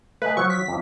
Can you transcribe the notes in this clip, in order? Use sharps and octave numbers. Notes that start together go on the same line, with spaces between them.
A3 B4 D#5 G#5
F3 F#3 C#6
B6
F2 F3